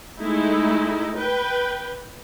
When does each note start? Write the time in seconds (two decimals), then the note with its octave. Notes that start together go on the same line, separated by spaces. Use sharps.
0.19 G#3 A3 D#4 E4
1.17 B4 G5